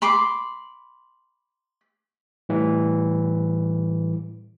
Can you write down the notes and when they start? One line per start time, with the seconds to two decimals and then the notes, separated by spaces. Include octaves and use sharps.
0.02 B5 C6 D6
2.49 A2 E3 G3